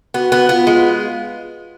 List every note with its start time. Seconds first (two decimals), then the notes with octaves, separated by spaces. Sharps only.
0.14 B3 F#4
0.32 B3
0.49 B3 F4
0.67 G#3